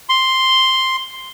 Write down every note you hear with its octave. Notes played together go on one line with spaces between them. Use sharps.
C6